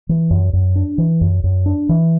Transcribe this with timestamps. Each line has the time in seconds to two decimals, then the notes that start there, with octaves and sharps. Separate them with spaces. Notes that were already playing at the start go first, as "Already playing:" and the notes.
0.09 E3
0.30 F#2
0.53 F#2
0.76 D4
0.98 E3
1.21 F#2
1.44 F#2
1.66 D4
1.89 E3